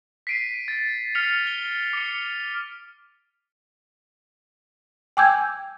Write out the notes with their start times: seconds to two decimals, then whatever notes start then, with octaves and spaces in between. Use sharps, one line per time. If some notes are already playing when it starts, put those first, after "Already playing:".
0.27 B6 C7 D7 D#7
0.68 A6
1.15 F6 B6 C#7 F7
1.47 G7
1.93 D6 C#7
5.17 G5 G#5 D6 E6 G6 G#6